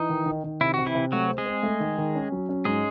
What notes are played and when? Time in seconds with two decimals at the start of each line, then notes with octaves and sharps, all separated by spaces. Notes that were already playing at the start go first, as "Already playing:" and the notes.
Already playing: E3 D#4
0.09 D#3
0.26 D#3
0.44 D#3
0.61 C3 E4
0.74 C3 F#4
0.86 E3 E4
0.95 C3
1.12 F#3 A3 F#4
1.29 C4
1.38 G#3 G#4
1.46 C4
1.63 A3
1.80 D#3
1.98 D#3
2.15 C#4
2.32 F#3
2.49 C#4
2.65 G#2 G#3 G#4